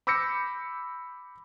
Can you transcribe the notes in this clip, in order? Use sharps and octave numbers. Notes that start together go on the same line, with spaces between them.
B5 D6 E6 G6 A#6 C#7